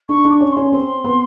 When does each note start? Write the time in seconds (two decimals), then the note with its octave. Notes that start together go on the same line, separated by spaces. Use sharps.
0.09 D4 C#6
0.25 D4
0.30 D6
0.34 C#6
0.41 C#4
0.51 C6
0.57 C#4
0.72 C4 C6
1.04 B3